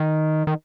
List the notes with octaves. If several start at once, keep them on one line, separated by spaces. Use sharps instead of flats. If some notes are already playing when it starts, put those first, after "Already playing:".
Already playing: D#3
D#3